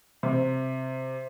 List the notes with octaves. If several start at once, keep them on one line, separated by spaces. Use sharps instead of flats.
C3